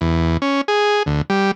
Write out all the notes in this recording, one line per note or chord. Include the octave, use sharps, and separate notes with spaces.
E2
C#4
G#4
D2
G3